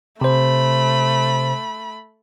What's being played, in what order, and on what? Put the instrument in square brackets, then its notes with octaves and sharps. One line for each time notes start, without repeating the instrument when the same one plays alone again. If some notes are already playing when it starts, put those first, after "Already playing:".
[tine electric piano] C3 C5 [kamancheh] A3 B5